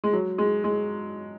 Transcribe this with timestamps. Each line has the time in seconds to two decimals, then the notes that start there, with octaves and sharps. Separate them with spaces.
0.04 G#3
0.13 F#3
0.38 G#3
0.64 G#3